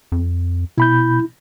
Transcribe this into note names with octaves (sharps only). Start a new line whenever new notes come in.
F2
B2 E4 B5 G6